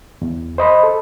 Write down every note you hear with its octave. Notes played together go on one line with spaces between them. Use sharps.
E2
C5 D#5 B5
A4